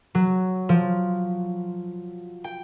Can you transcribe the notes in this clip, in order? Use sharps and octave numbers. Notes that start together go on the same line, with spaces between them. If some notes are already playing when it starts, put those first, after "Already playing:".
F#3
F3
G5